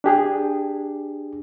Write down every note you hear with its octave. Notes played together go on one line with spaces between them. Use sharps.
D4 G4 G#4